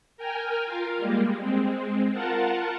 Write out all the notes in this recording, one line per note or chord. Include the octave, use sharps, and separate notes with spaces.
A#4 G5 G#5 F6
F4 A#4 F5
G3 G#3 A#3
G#3 C4
F4 A#4 F#5 A5